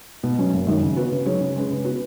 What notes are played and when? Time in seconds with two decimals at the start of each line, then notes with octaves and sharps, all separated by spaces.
0.23 B2
0.38 F#3 C#4
0.53 F#1
0.67 F#2 D#3 F#3
0.82 C#3
0.96 B3 F#4 B4
1.11 C#3
1.26 F#3 D#4 G#4 C#5
1.41 C#3
1.56 G#3 C#4 B4
1.70 C#3
1.85 B3 F#4 B4